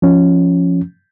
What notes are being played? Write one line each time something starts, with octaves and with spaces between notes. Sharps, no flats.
F3 C#4